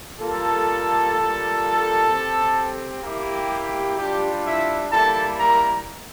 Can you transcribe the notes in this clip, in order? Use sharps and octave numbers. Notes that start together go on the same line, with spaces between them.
G3 A#3 F4 A4
G3 A#3 F4
C4 G4
A#3 E4 G4
G3 D4 F4 G4
E4 E5
G3 A#3 E4 A4 A5
A#4 A#5